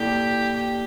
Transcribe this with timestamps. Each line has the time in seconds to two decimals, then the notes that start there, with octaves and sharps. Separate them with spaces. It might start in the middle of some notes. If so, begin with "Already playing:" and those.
Already playing: A#3 E4 G4 A4 D5
0.55 G4